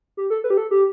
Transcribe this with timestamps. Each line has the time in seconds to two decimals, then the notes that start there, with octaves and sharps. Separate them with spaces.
0.17 G4
0.30 A4
0.44 B4
0.50 G4
0.57 A4
0.71 G4